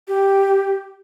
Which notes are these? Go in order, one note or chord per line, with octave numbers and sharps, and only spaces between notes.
G4